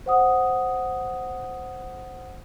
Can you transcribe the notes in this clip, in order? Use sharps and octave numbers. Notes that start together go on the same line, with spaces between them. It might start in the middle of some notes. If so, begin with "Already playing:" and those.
C5 F#5 D#6